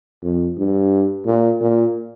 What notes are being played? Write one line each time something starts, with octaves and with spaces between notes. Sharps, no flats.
F2
G2
A#2
A#2